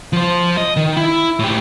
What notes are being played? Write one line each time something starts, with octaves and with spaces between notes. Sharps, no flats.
F3 C5
D#5
D#3
E4
A2 G4